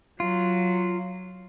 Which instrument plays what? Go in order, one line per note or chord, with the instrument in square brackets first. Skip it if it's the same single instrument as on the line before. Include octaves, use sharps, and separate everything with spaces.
[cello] F#3 [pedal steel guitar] F4